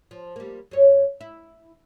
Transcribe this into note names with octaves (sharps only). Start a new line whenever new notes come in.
F3
G3 A#3
F#2 C#5
E4